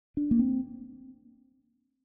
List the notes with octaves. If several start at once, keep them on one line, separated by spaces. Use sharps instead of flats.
D4
A#3
C4